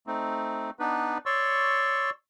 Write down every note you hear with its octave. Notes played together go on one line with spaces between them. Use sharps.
A3 C4 D#4
B3 D4 D#4 B4
C#5 D5 C6 C#6 E6